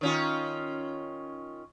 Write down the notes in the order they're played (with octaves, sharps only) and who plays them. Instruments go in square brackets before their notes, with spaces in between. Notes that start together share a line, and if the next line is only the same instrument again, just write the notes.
[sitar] D#3 C#4 F4